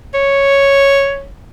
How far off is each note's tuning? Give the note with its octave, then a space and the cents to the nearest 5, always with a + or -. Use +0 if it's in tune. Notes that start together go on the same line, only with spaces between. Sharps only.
C#5 +0